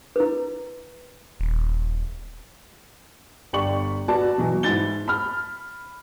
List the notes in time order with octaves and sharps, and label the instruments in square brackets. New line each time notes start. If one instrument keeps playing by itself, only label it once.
[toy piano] E4 B4
[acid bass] D#1
[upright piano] G1 G4 D5 C#6 F#7
B3 F#4 D5 A5
B2 E3 F#3
G#2 E4 A6 G7
B5 F6